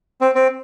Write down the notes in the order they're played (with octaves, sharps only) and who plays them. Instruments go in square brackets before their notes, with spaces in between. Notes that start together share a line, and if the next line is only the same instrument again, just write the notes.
[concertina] C4
C4